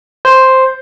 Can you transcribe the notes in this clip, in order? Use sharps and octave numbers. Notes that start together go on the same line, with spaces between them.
C5